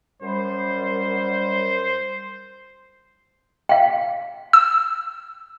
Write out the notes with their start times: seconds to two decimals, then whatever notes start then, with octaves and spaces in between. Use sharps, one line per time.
0.22 F#2 G3 C5
3.69 F5 G5
4.53 E6